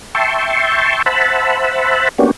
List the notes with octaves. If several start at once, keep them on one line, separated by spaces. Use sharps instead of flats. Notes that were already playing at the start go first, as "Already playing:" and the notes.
E5 G5 A5 C6 C#6
C5 E5 F#5 A5 B5
A#3 B3 C#4 D4 F#4 G4